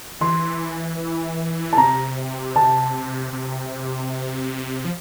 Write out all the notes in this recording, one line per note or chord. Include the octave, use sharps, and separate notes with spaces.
E3 C6
A5
C3 A#5
A5
C3
F3